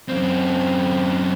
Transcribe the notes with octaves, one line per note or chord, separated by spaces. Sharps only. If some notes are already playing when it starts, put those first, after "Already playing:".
F#2 C4